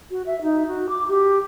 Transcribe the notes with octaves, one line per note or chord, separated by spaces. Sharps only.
F#4
E5
D#4
F#4
D6
G4